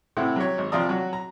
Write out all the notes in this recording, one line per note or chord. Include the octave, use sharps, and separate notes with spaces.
A2 C3 C4 E4 F#5
F#3 G4 C#5
G#1
C3 F3 F4 D5 A#5 D#6
F#3 F#4
A#5